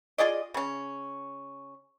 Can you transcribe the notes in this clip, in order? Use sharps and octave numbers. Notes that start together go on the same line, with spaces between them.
F4 G#4 D5 D#5
C#3 C#4